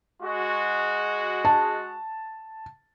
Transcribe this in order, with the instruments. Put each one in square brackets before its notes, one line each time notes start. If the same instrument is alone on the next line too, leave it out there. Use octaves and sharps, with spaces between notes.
[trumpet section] G#3 F#4
[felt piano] A5